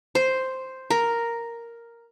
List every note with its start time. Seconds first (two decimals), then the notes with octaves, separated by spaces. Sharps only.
0.15 C5
0.90 A#4